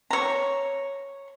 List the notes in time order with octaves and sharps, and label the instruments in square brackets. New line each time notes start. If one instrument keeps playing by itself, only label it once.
[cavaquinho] C#5 A#5